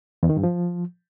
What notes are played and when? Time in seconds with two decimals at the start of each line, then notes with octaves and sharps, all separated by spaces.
0.23 E2
0.30 D#3
0.37 G2
0.43 F3